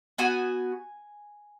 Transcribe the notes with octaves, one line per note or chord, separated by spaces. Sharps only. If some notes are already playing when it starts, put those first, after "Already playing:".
B3 F#4 G#5